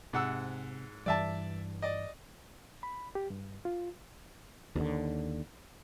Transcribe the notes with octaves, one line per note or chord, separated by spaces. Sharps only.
G#2 C3 F#5 E6
G2 E3 G3 D5 E5 A5
D5 D#5
B5
G4
G2
F4
D#2 D3